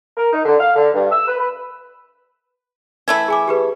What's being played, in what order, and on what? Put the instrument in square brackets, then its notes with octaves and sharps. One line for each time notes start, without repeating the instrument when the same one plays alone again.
[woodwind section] A#4
D#4
D3
F5
D3
G2
E6
B4
B4
[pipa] E3 A3 E4 [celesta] G#6
[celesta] G#4 G#5 D6
G4 G#4 B4